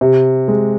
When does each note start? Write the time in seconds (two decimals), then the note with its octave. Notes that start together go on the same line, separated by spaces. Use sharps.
0.01 C3
0.48 G#3